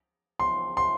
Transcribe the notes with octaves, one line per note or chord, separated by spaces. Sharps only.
C6
C6